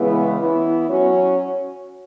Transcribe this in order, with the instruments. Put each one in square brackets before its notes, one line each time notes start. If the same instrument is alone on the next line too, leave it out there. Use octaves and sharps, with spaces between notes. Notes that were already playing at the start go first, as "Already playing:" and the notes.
Already playing: [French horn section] C#3 E3 G#3 B3 E4
E3 B3 E4
F#3 C#4 F#4 C#5